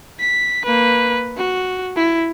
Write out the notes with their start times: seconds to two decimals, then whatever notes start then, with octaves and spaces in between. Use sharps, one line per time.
0.19 B6
0.65 A#3 B4
1.37 F#4
1.96 E4